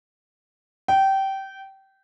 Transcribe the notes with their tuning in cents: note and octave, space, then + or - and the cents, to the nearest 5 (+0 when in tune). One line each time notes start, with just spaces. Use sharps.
G5 -20